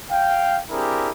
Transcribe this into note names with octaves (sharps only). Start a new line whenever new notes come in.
F5 G5
C4 D4 E4 G4 G#4 A#4